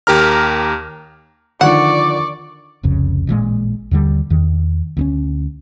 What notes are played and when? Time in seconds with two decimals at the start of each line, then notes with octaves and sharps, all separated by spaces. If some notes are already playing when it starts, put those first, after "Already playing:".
0.07 D#2 G4 A#4 A#5 F6
1.61 D3 D#3 F3 D5 F#5 C#6
2.83 F1 C2 F2 C#3
3.27 A1 A#2 E3 G#3
3.91 D#2 D3 G3
4.30 E2 D#3
4.97 D2 B3 C#4